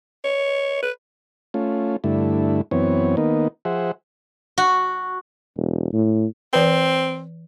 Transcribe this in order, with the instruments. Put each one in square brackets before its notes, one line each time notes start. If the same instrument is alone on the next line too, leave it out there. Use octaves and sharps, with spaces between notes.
[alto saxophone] C#5
B4
[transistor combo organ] A3 C#4 F4
G2 D3 A3 E4
F#2 E3 B3 C4 C#5
D#3 A#3 B3 D#4
F3 G#4 C5 E5 F#5
[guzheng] F#4
[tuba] E1
A2
[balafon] E3 B4 [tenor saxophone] C4